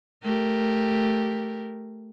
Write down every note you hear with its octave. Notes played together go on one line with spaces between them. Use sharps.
A3 G4 A#4